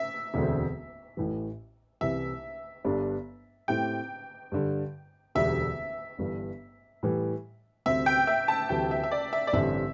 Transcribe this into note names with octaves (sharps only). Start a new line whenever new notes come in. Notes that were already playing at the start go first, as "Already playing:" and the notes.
Already playing: E5
E1 D2 D3 C4
A1 A2 E3
C2 C3 E3 E5
G1 G2 G3 D4
A2 A3 C4 E4 G4 G5
G2 D3 G3
E1 D2 D3 G3 D4 E5
G1 G2 E3 G3
A2 E3 G3
D2 C3 G3 C4 E5
G5
E5
A5
D2 C3 E3 G3 G5
E5
E5
D5
E5
D5
A1 G2 D3 C4 E5